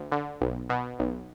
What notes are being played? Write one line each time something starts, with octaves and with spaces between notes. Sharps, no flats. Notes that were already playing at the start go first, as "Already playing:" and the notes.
Already playing: D2
D3
B1
B2
B1